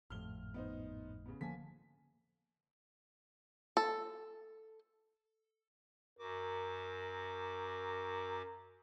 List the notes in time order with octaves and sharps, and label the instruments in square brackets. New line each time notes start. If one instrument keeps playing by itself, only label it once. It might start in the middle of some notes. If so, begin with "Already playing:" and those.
[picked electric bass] G#1 F2 A2 [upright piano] F6 G7
[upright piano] B3 D#4 C5
C#3 B3
[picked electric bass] D3 F3 A#3 [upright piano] G#5 A5 B6
[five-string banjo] A4
[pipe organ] F#2 F#4 D6 [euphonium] A#4